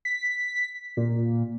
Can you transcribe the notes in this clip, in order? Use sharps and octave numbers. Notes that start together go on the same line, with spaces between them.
B6
A#2